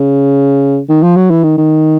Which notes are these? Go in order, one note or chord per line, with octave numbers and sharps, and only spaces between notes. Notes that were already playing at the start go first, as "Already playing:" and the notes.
Already playing: C#3
D#3
F3
F#3
E3
D#3
D#3